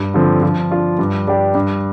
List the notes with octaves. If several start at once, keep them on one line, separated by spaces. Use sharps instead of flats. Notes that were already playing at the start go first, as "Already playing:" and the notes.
Already playing: G2
D3 F3 C4
F3
D4 F4
G2
G3 D4 G4
G2